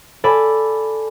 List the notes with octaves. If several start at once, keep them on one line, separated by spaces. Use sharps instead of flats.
A4 D5 G#5 B5